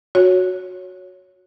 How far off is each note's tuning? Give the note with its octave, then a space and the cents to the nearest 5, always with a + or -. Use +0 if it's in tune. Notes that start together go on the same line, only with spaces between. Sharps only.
F#4 -10 C#5 +0